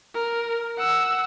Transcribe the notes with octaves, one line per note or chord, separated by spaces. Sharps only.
A#4
F#5 E6